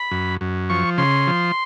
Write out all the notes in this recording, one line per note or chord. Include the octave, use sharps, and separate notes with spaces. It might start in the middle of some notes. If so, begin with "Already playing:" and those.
Already playing: B5
F#2
F#2
F3 C#6
C#3 C6
F3